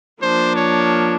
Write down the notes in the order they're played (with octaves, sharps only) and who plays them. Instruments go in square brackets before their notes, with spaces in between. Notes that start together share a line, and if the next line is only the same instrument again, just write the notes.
[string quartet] F3 A#3 D4 [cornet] C5
[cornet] C#5